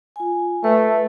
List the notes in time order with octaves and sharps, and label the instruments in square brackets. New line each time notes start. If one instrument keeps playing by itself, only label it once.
[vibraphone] F4 G#5
[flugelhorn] A3 [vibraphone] B4